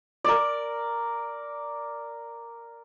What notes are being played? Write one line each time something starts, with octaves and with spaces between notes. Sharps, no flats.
A#4 D5